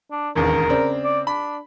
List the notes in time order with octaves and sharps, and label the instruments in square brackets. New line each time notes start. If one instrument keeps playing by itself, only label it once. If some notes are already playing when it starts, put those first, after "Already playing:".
[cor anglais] D4
[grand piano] E1 A1 D#2 [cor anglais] A#4
[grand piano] C#3 C4 D4
[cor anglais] D5
[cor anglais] D4 [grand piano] B5